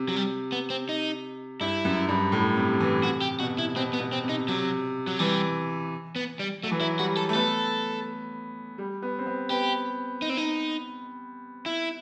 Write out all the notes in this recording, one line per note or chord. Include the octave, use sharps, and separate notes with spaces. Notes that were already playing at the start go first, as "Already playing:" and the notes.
Already playing: C3
F#3
G3
B3
C4
D#4
G2 E4
F#2
G2
A2
C3
E3
C3 F#4
G4
B2 F#4
E4
B2 C4
B3
B2
C4
C3
D#4
C3 F#3
F#3
E3 G3
B3
G3
F#3 A3
E3
F#3 E4
G3 F#4
A4
A3
B3 A4
G3
B3
C4
B3
B3 G4
D#4
C4
D#4
E4